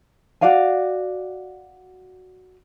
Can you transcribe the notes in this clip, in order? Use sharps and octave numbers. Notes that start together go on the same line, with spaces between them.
F#4 D5 F5 G#5